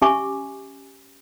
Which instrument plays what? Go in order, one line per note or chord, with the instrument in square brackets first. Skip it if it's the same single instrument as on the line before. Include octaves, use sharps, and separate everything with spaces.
[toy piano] C#4 G4 E5 G#5 C#6 D6